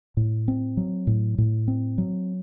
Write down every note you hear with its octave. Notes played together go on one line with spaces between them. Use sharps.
A2
C4
F#3
A2
A2
C4
F#3